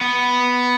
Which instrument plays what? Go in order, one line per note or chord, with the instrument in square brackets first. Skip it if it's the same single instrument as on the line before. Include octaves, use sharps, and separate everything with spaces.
[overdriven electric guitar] B3